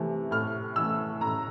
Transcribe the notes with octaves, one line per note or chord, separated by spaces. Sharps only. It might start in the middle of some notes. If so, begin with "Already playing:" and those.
Already playing: C3 E3 A3
A2 F6
E3 A3 E6
A2 A#5